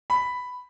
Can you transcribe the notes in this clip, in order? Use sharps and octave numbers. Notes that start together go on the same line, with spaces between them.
B5